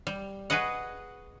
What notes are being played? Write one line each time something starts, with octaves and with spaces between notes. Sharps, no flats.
G3
F#4 G#4 B4 D#5 F#5